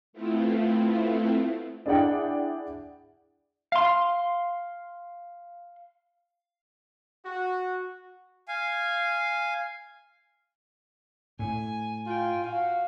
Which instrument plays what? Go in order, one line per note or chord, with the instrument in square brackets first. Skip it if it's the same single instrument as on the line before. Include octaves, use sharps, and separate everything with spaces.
[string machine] A3 B3 C4 E4 F4
[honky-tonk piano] D4 E4 G#4 D5 F#5 G5
[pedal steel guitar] F5 C6
[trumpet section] F#4
[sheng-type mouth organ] F5 G#5
[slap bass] A2 [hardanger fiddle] G#5
[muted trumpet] F4 [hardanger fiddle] G5 G#5
[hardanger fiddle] F#4 [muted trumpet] F5